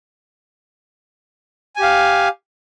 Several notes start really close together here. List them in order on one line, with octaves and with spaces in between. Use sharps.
G#5 G4 F5